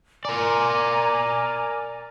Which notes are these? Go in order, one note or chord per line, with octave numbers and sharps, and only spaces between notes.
A#4 D5 G#5 A#5 D6